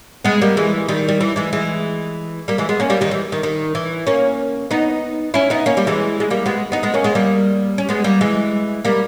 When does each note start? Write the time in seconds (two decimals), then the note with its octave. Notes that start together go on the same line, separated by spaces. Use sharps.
0.25 G#3 B3
0.42 G3 A#3
0.57 E3 G#3
0.88 D#3 G3
1.08 G3
1.21 E3
1.36 E3 G#3
1.53 E3 G#3
2.48 G3 A#3
2.58 E3 G#3
2.69 G#3 B3
2.80 A#3 C#4
2.90 G3 A#3
3.01 D#3 G3
3.11 E3
3.32 D#3
3.43 D#3
3.75 E3
4.07 A#3 C#4
4.71 B3 D#4
5.34 C#4 E4
5.50 B3 D#4
5.66 A#3 C#4
5.77 G3 A#3
5.87 E3 G#3
6.20 G#3
6.30 G3 A#3
6.46 G#3 B3
6.72 B3 D#4
6.83 G#3 B3
6.94 A#3 C#4
7.04 G#3 B3
7.15 G3 A#3
7.78 C#4
7.89 G#3 B3
8.04 G3 A#3
8.21 E3 G#3
8.85 G3 A#3